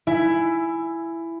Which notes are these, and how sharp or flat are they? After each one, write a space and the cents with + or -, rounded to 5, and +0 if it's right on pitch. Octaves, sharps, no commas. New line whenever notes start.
E4 +10 E5 +25 G#5 +0